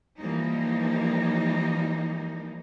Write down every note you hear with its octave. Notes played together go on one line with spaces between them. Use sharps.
E3 F3 G3 A#3 D#4